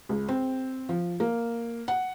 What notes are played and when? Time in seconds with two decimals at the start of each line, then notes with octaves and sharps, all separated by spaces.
0.09 C#2
0.29 C4
0.89 F3
1.20 A#3
1.88 F#5